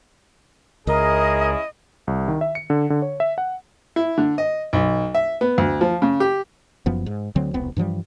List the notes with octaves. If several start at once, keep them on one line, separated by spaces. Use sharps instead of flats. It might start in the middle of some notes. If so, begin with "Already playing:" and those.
C#2 C#4 E4 G#4 A#4 D#5
C2
D#3
E5
C#7
D3
D3
C#5
E5
F#5
E4
D3
D#5
B1
E5
B3
D2
F3
C#3
G4
F#1 F#2 F3 B3
G#2
D2 D3 F#3 C4
E1 C2 B3 C4
G2 E3 F3 G3